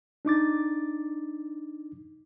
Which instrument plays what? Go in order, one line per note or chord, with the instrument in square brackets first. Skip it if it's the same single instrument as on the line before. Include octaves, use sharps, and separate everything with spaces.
[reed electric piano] D4 D#4 D6 A6